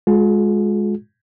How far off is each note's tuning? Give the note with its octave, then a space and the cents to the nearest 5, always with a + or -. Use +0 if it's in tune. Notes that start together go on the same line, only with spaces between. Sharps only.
G#3 +0 F4 +45 G#4 +45